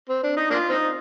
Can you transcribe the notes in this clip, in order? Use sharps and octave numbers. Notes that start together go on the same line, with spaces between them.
C4
D4
D#4
A#3 D4 F4
C4 D#4